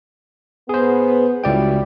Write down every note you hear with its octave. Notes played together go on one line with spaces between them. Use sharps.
B3 G#4 C5
C#2 G3 E4 F#4 D5 G5